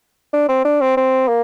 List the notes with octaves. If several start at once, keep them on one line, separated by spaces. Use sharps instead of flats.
D4
C4
D4
C4
C4
A#3